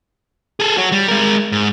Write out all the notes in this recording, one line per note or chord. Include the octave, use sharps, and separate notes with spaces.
G#4 A4
F#4 C#5
G3
G#3 A#4
G#2